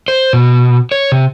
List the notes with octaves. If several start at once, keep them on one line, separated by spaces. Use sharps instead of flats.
C5
B2
C#5
C3